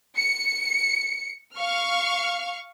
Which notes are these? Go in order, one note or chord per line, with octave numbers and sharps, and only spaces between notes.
C#7
F5 C#6 F6